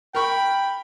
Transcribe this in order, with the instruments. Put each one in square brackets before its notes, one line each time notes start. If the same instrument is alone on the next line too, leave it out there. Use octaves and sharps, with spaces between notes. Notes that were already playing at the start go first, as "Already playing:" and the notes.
[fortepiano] A#4 C#6 [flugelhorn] G5 [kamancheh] B5